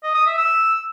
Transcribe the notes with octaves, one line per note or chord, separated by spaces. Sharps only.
D#5
D#6
E5
E6